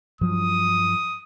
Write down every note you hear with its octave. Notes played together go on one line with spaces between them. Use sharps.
G2 F3 F#3 D#6